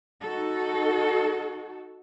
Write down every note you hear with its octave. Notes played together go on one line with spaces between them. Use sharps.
D#4 F#4 A4